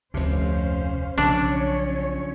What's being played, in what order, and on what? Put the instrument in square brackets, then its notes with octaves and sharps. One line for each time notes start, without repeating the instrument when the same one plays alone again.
[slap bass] F1 C3 [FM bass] D2 [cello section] C#4 C5 F5
[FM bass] B1 [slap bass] C#3 F3 F#3 [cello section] C#4 C#5 [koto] D4